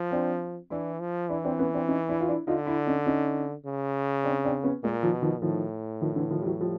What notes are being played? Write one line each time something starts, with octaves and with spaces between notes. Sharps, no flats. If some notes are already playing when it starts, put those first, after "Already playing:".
Already playing: F3
C4 D4
E3 D4 E4
F3
E3 D4 E4
C4 D4
B3 C#4
C4 D4
C#4 D#4
D4 E4
F4
D4 E4
D3 D#4 F4
D4 E4
C#4 D#4
C#4 D#4
C#3
C4 D4
C4 D4
B3 C#4
A#2 G#3 A#3
D#3 F3
B2
D#3 F3
A2 D#3 F3
D#3 F3
D3 E3
D#3 F3
G3
E3 F#3
F3 G3